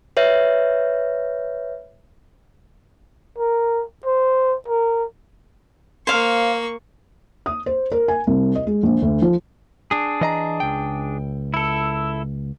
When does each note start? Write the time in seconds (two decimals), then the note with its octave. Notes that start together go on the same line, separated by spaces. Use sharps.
0.17 B4 C#5 E5
3.38 A#4
4.05 C5
4.68 A#4
6.07 A#3 C5 F5 C#6
7.46 D#6
7.66 C5
7.92 A#4
8.08 G#5
8.27 C2
8.55 D#5
8.67 G#3
8.83 A#1
9.02 D2
9.22 F3
9.91 D4 G#4
10.21 E3 D#5 A#5
10.60 C#2 G5
11.54 E4 A4